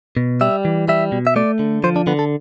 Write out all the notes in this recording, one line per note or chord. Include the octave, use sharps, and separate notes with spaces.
B2
G3 E5
E3
G3 E5
B2
E5
A3 D5
D3
F3 C5
D4
D3 B3
A4